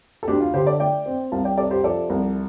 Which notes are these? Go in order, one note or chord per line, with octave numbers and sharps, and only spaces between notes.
A4
D2 D4 G4
F4
D3 G4 C5
A4 D5
A3 D5 G5
C4
C2 F5 A5
D5 G5
C3 A4 D5
G4 C5
F3 A4 D5
C2